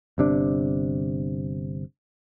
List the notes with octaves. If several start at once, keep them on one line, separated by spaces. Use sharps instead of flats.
G1 C3 D4